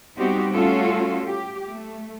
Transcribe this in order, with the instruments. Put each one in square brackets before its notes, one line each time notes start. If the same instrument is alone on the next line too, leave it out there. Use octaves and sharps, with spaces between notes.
[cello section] G3 B3 C4 D#4 F#4 G4
G3 A3 C#4 F4 F#4 A4
G4
A3